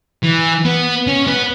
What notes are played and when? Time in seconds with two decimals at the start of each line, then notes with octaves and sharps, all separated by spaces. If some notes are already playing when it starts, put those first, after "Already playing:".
0.23 E3
0.65 B3
1.07 C#4
1.27 B3